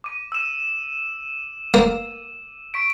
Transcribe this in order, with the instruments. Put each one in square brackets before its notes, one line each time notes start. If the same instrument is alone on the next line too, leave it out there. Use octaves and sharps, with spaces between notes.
[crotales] D6 D#7
E6 E7
[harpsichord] A#3
[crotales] C#6 B6 D7